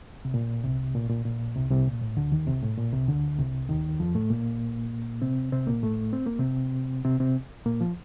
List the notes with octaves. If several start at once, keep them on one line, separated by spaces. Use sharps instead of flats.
C3
A#2
C2 C3
A#2
A#2
A#2
C2 C3
C2 C3
A#2
A2
D2 D3
D#2 D#3
C2 C3
A2
A#2
C2 C3
D2 D3
C2 C3
D#2 D#3
F2 F3
A2 A3
A#2 A#3
C3 C4
C3 C4
A#2 A#3
A2 A3
C4
A#3
C3 C4
C3 C4
C3 C4
A#2 A#3
F3